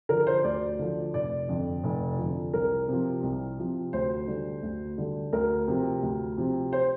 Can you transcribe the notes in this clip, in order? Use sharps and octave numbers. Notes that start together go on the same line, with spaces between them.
D3 F3 A#4
C5
D2 D5
D3 F3
F1 D5
F2 D3 F3
F1
F2 D3 F3
C2 A#4
C3 F3
C2
C3 F3
D2 C5
D3 G3
D2
D3 G3
D2 A#4
C3 F3
D2
C3 F3
C5